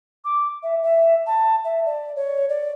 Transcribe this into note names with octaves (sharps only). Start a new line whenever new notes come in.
D6
E5
E5
A5
E5
D5
C#5
D5